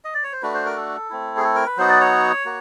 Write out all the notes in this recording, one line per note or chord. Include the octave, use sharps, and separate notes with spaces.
D#5
D5
C#5
C5
A3 D4 F#4 B4
C5
A#4
A4
A3 C4 E4
G#4
A4
A#4
B4
F#3 B3 D#4 F#4 C5
D5
C#5
A#3 F#4